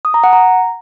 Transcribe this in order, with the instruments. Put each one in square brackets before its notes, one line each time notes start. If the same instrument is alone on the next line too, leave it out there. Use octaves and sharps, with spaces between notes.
[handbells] D#6
A#5
F#5
A#5